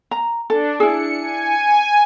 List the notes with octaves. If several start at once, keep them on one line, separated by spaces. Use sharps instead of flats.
A#5
D4 A4
E4 G#4 C#7
G#5